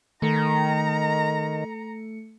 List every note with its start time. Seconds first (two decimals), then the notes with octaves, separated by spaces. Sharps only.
0.22 D#3 A3 A4 A#5 C#7